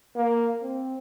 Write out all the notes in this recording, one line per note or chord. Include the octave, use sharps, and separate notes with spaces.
A#3
C4